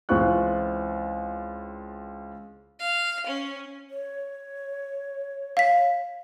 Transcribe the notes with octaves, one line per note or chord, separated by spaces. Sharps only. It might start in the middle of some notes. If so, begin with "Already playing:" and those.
C#2 E3 C4 F4 C#6 F#6
F5
C#4
C#5
F5 B6